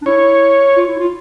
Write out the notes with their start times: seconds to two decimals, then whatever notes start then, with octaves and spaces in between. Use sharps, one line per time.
0.02 D4
0.06 E4 C#5
0.77 F4
0.88 E4
0.99 F4